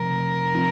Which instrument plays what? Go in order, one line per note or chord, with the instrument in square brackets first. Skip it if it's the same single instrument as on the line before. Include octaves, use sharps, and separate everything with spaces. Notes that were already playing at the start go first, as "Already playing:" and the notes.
Already playing: [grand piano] F1 F2 F3 C4 [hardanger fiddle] A#4
[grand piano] F1
F3 C4